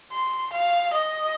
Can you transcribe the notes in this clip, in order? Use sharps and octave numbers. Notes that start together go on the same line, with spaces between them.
C6
F5
D#5